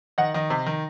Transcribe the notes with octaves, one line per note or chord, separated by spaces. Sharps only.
D#3 D#5 F#5
D#3 D#5
C3
D#3